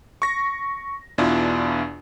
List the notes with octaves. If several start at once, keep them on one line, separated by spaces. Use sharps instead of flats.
C#6 A#6
E2 B2 D4 E4 F4